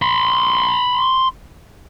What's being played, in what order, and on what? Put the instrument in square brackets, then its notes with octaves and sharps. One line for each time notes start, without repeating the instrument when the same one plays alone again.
[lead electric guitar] B5 C6